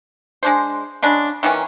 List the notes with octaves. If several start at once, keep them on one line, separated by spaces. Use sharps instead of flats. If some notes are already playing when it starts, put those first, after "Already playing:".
G#3 D4 C5
C#3 G#3 D4
D#3 E3 A#3 C#4